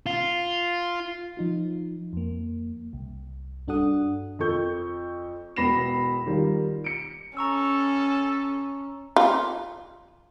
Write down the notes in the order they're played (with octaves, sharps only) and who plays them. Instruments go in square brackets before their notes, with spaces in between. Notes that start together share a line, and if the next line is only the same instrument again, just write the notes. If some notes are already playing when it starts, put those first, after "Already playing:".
[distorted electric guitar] F4
[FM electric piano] F3 D#4 F4
F2 A#3
C2
G2 D4 F#4 A4 F#5 D#6
[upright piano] F2 F3 A4 C#6 G6
E1 B3 B5 A#6 C7 E7
D#3 G3 F4
C#7 D7
[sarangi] C#4 [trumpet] A4 [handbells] A#5 C#6 E6
[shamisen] F4